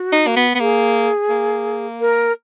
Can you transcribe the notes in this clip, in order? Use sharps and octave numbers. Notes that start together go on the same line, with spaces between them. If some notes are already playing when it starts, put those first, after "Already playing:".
Already playing: F#4
D#4
A#3
B3
B3
A#3 G#4
A#3
A#4